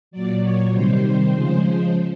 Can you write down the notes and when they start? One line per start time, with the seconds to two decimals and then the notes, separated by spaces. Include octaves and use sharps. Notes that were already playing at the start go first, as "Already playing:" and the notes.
0.11 A#2 F#3 D5
0.41 C#5
0.72 C3 D#3 G3 C5
1.33 C#3 F3 G#3